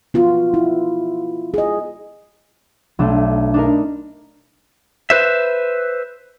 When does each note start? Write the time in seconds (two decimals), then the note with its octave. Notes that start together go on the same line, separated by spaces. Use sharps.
0.14 B3 F4 F#4
0.54 E4
1.54 G#4 D#5
2.99 B1 A3 D4
3.54 D4 D#4 A#4
5.10 B4 C5 E5